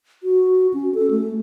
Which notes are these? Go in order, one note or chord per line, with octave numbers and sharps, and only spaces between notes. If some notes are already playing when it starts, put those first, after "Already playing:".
F#4
C#4
A4
A3